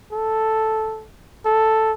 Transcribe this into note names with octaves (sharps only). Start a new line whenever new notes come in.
A4
A4